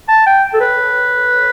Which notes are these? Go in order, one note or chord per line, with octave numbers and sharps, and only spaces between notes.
A5
G5
A4
B4